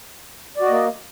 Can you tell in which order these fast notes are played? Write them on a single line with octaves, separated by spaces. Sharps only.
D5 F#4 D#5 A#3